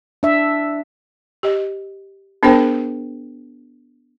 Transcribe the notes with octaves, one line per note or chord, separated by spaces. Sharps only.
D4 E5
G4 D#5
B3 D4 G#4 A#4 C5 G5